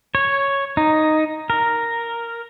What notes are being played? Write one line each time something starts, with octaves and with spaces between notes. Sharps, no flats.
C#5
D#4
A#4